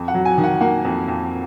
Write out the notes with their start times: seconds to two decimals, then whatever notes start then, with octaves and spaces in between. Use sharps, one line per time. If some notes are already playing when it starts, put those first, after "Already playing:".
Already playing: F2
0.08 F#5
0.14 F#3
0.25 G#5
0.38 D#3
0.44 F#5
0.61 A#3 F#5
0.85 F2
1.08 F2